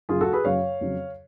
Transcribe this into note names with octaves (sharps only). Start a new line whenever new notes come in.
F#2 C#3 F#3 F4 G#4
F#4 A4
G#4 B4
F#2 C#3 F#3 C#5 F5
F2 C#3 F#3